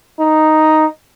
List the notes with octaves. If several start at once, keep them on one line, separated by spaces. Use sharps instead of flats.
D#4